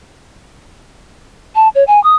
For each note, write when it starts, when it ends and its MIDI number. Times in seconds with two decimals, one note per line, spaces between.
1.55 1.68 81
1.75 1.84 73
1.87 2.02 80
2.04 2.16 87